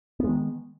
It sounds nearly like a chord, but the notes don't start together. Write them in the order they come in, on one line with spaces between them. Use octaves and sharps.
B3 G#3 D#3